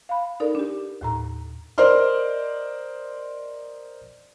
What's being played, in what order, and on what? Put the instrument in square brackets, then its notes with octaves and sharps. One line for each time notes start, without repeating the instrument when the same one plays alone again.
[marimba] F5 B5
D#4 A4 A#4 D5
D4 G4
D#2 A2 A#5
[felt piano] A#4 C5 D5 D#5 C6 F6